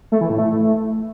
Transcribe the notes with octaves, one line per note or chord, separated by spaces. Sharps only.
A3
E3
A2
A3